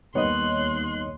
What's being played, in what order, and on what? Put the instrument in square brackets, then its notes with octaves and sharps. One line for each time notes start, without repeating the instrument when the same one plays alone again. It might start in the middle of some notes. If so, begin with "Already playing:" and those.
[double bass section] D#2 [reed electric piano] G3 B3 D#4 [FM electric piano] C#5 D#5 [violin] C6 F#6